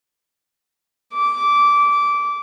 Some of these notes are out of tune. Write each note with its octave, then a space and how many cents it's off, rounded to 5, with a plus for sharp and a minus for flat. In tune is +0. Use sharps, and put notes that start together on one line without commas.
D6 -15